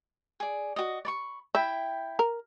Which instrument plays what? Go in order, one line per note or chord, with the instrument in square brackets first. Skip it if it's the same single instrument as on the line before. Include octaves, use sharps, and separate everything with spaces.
[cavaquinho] G#4 D5
F#4 D#5
D5 B5 C#6
[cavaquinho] E4 G5 B5 [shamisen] E5
[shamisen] A#4